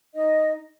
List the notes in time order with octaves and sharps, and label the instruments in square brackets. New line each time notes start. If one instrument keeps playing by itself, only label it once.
[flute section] D#4 D#5